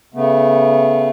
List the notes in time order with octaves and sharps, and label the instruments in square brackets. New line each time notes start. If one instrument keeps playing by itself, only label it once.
[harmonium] C#3 A3 B3